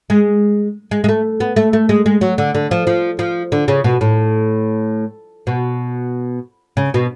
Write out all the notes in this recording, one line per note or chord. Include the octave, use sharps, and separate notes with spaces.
G#3
G#3
G#3
A3
B3
A3
A3
G#3
G#3
F#3
D3
D3
F3
F3
F3
D3
C#3
B2
A2
B2
C#3
B2